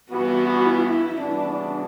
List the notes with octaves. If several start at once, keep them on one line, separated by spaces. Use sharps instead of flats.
G2 E3 B3 F#4
E4
C#3 E3 G3 B3 D4 F#4